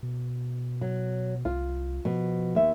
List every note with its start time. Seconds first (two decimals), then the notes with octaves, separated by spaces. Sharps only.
0.03 B2
0.81 F#3
1.45 C2 F4
2.05 B2 F3
2.55 D#2 E5